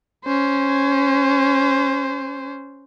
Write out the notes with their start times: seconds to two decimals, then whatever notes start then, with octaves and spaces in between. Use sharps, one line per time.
0.25 C#4 C5